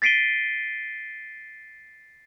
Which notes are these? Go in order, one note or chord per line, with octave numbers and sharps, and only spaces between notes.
A6 B6 C7 D7 D#7 G7